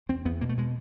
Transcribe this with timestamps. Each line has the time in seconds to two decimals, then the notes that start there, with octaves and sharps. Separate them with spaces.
0.09 E2 C4
0.25 E2 B3
0.41 B2 A#3
0.49 A3
0.57 B2 G#3